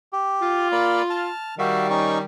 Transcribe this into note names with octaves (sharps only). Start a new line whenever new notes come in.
G4
F4
A#3 D5 B5
A5 F6
D#3 G3 F#4 E5 F5
C#4 D#4 C#6